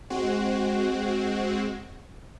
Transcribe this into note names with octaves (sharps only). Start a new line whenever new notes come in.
G#3 C4 F#4